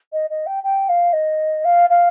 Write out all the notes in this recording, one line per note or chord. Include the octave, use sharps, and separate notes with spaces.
D#5
D#5
G5
G5
F5
D#5
F5
F5